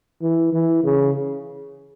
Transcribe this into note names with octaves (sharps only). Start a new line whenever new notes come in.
E3
E3
C#3